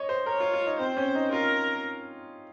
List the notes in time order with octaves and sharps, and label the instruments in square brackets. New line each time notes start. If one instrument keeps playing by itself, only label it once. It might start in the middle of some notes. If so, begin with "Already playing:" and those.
Already playing: [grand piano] C#5 D#5
C5
[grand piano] A#4 [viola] C#5
[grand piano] F4
F4
D#4
[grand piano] C4 [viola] C5
[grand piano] C#4
D#4
[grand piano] F4 [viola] A#4